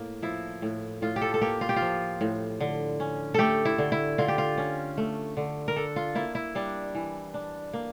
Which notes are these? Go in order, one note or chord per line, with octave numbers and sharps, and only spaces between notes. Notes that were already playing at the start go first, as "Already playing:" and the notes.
Already playing: A2 A#3
F3 E4
A2
A2 F4
G4
A4
A4
A#3 G4
F4
G4
F4
F3
A2
D3
C#4
A3 G4 A4
E4
D3
E4
D3 F4
G4
F4
C#4
A3
D3
A#4
D4 A4
F4
A#3 E4
E4
G3 D4
E3
D4
A#3